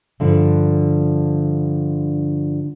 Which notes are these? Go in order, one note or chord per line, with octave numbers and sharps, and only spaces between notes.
G2 D3 F3